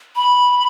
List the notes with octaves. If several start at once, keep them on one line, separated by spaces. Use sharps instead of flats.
B5